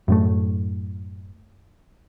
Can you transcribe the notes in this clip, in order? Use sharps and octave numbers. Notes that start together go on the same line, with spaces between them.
F#2 A2 A3